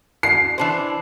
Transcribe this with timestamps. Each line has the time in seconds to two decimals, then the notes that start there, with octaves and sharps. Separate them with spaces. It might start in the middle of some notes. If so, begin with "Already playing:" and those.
0.23 C7
0.58 E3 D4 C5